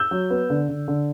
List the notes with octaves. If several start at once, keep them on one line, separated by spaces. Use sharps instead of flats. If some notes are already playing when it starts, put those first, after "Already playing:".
Already playing: E6 G6
F#3
B3
D3
D3
D3